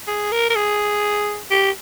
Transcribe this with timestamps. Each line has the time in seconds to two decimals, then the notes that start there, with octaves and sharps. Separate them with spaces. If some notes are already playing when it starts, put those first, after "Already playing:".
0.07 G#4
0.32 A#4
0.50 A#4
0.55 G#4
1.50 G4